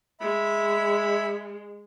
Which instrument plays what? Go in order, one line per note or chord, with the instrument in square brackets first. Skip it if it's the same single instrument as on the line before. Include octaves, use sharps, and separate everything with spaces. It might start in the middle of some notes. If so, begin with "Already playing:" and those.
[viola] G#3 [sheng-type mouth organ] E5 B5